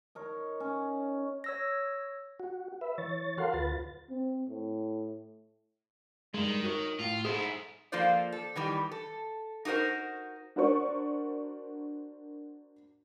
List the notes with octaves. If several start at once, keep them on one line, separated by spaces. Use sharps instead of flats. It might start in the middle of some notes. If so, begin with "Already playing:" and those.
D#4 A#4 C#5
C#4
C#5 E6 A#6
F#4
B4 E5
E3 C#5 A6
F#4 A4 A#4 F5 F#5 C6
D2 F4 B4 A6
C4
A2
G2 D#3 G#3
F#4 A#4 C#5
A2 F4
G#2 E4 G#4 A4 C5
F3 A#3 F4 A4 C5 D5
A4
D#3 E3 G3
A4
D#4 F#4 G4 A#4 C5
D4 F#4 A#4 C5 D5 C#6